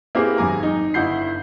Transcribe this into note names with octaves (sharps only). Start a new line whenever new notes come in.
A#3 C4 E4 G4 G#4 B4
G#1 F#2 G#5 A#5 D6
D#4
G1 E4 F#5 G6 C7